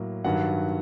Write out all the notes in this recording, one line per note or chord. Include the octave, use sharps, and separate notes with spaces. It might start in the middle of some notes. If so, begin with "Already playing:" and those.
Already playing: A2 F#3 A#3
G2 D#3 F#3 F#5